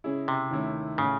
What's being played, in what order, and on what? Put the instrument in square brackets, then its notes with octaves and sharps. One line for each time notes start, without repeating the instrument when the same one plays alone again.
[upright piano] C#3 G#3 C#4 E4 G#4
[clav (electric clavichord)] C3
[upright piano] D#2 D#3 A3 C#4 E4
[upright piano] A2 G#3 C#4 [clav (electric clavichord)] C#3